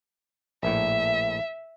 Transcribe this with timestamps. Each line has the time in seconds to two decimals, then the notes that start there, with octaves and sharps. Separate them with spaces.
0.63 A#1 A2 E5